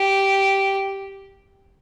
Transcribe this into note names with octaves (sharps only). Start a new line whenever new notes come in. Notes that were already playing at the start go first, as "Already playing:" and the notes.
Already playing: G4